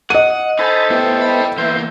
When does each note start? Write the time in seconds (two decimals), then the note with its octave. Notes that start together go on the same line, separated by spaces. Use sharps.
0.10 D#5 F#5 D#7
0.59 D#4 A4 C5 G#5 B5 A6
0.90 A3 B3 E4 G4
1.21 G5 B5
1.58 E2 A#3 E4 B4 E5 C6 G6